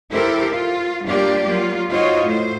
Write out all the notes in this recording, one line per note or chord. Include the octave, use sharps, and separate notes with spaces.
E4 G4 A4 A#4 C5
F4
G3 A#3 D4 F4 G4 D5
F#3 A#3 F4
D#4 F4 F#4 C5 C#5 D#5
A2 C5